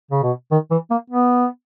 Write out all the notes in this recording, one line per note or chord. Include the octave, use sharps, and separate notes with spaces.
C#3
B2
D#3
E3
A#3
B3